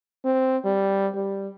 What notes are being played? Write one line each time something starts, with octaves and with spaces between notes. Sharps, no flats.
C4
G3
G3